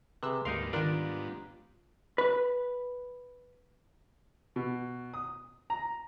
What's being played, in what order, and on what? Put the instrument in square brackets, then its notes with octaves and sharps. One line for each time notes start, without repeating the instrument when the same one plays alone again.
[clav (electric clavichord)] C3 [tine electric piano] G#4 B4 [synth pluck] E6 F#6
[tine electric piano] D2 [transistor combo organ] G#2 G3 B3 [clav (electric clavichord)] D#4 A#4 F5 [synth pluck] C6
[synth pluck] D#3 A#4 [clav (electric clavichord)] D4 D5 [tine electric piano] F4 A#5
[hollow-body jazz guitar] B4
[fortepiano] B2
D#6
A#5